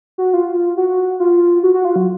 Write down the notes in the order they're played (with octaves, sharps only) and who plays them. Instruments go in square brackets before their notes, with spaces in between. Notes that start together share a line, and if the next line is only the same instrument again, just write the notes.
[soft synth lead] F#4
F4
F#4
F4
F#4
F#4
F4
F#3